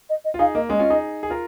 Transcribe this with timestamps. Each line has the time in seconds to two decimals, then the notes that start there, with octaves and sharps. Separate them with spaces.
0.09 D#5
0.25 D#5
0.34 F4
0.39 D#4 G#4 F5
0.55 A#3 D#5
0.69 G#3 C#4 D#5
0.79 C#4 F4
0.90 D#4 G#4
1.23 G#4
1.30 F4 A#4